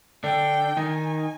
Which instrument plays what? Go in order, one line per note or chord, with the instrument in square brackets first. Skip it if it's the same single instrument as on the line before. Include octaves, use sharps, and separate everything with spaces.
[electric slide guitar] D3 D4 [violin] G5
[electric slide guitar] D#3 D#4 [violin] G#5